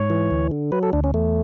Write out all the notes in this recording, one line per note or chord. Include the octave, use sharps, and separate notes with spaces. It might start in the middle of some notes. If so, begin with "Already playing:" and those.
Already playing: G#2 C#5
E3
D2
D3
F#3 B4
A4
D2 D4
C#4
E2 A3